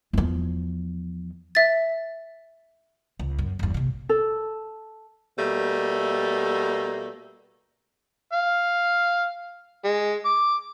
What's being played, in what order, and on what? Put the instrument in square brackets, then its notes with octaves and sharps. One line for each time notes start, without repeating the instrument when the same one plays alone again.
[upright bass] E2 F3
[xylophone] E5 A6
[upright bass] C#2
F#2
G1 E2
A#1 C3
[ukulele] A4
[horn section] B2 G3 A3 A#3
[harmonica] F5
G#3
D6